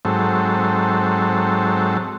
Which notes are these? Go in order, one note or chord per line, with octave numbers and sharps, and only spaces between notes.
G#2 F#3 C4 A4